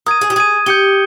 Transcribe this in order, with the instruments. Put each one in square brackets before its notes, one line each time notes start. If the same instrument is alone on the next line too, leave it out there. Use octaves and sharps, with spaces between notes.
[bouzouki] A#4 [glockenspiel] D#6 G#6 D#7
[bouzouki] G#4
G4
[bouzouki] G#4 [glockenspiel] D#6 G#6 D#7
[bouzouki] G4 [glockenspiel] G6 C#7 G7